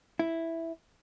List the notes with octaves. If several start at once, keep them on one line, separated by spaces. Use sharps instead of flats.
E4